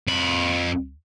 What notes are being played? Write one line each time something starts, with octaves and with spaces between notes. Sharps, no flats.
F2 B5